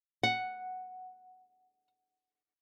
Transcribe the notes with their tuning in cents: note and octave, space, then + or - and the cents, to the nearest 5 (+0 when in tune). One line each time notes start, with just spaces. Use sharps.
F#5 +0